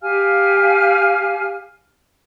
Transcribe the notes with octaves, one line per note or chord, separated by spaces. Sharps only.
G4 F5 G#5 F6